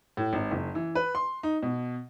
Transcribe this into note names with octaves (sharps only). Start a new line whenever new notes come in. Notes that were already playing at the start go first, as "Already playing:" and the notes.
A2
G#1
F#1
E3
B4
C6
D#4
B2